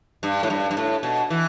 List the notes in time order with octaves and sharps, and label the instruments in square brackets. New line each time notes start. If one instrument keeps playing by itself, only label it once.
[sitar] G2
A2
G2
G2
A2
B2
E3